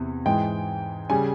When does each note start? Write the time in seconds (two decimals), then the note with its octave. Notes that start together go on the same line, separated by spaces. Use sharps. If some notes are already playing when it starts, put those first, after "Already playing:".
Already playing: E2 C3 E3
0.25 G#2 E3 G#3 G5
1.10 C#3 G3 G#5